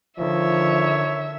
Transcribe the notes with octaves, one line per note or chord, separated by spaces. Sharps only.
D3 D#3 F3 C#5 E5